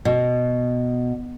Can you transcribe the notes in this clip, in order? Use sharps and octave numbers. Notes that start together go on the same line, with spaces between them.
B2